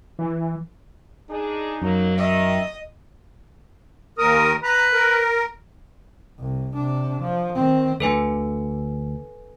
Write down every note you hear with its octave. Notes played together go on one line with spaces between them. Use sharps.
E3
D4 D#4 G#4
F#2 F#3 A#3
D#3 D#5 E5
D#2 A#4 D#6
B4 A#5
A#4
C2
C3 D4
F3
D#3 C4
D2 D3 A4 B4 G#5